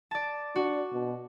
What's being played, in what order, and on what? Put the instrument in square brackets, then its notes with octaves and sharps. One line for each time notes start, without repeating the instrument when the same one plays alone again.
[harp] D5 A5
[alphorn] D4 [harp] F#4
[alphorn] B2